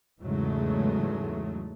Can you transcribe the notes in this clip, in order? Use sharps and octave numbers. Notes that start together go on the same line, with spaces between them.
E2 G#2 C#3 F#3 G#3 A3